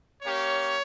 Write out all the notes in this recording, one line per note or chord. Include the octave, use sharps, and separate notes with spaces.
A#3 C#4 G4 C#5